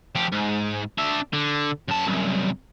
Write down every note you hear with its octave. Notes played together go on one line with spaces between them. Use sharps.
F3 G4
G#2
D4 E5
D3
F#2 A5
C2 F#2